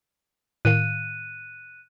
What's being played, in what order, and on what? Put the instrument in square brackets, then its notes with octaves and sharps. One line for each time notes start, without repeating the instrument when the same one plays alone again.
[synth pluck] A2 D#3 F5 [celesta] F#6 D#7